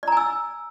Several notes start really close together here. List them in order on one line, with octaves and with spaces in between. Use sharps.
D5 A#5 G#5 E6